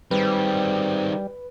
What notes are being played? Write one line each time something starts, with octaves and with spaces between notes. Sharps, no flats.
D#3 G3 C4 B4